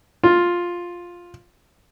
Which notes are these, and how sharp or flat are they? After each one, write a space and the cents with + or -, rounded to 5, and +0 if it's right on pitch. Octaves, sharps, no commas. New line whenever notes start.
F4 +5